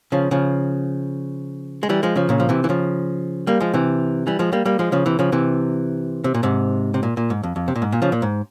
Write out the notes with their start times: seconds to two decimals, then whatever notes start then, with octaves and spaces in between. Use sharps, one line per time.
0.12 C#3 F3
0.31 C#3 F3
1.83 G#3
1.89 E3 G3
2.03 F3 G#3
2.16 C#3 F3
2.29 A#2 C#3
2.40 F3
2.49 C3 E3
2.64 E3
2.69 C#3 F3
3.47 G3 A#3
3.60 F3 G#3
3.74 C3 E3
4.27 E3 G3
4.39 F3 G#3
4.53 G3 A#3
4.65 G3 A#3
4.79 F3 G#3
4.92 C#3 F3
5.06 C3 E3
5.19 C#3 F3
5.32 C3 E3
6.24 C3
6.34 A#2
6.43 G#2 C3
6.94 C3
7.03 A#2
7.17 A#2
7.30 G#2
7.43 F2
7.56 F2
7.68 C3
7.76 A#2
7.82 G#2
7.92 A#2
8.02 C#3 F3
8.12 A#2
8.22 G#2